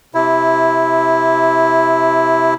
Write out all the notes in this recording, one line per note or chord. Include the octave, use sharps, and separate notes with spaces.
C3 E4